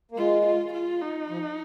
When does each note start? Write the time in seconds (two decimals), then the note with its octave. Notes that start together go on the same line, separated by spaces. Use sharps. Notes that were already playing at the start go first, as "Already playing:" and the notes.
0.11 A#3
0.17 G#3 F4
0.46 F4
0.73 F4
1.02 D#4
1.30 F3